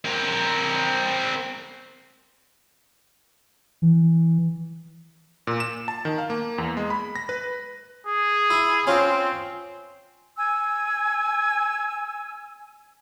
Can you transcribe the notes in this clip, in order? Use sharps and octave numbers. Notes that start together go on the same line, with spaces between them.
C4 A#4
E3
A#2
E7
A5
D#3
F5
A#3
E2
G#3
B5
A#6
B4
G#4
E4
C4 C#4 F4
G#5 E6